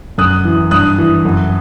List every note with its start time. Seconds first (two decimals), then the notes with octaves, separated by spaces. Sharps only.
0.18 F#2 D#6 F#6
0.45 E3
0.71 G2 D#6 F#6
0.98 E3
1.25 F#2